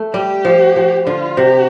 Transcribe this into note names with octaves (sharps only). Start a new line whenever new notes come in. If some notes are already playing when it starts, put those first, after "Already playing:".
Already playing: A3
G3 G4
F3
F3
D3 F4
C3 G4